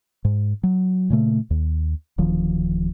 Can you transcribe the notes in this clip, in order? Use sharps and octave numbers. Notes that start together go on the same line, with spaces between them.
G#2
F#3
A#2 C#3 A3
D#2
D1 D#3 F3